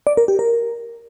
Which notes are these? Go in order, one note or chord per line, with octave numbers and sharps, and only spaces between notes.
D5
A#4
G4
A#4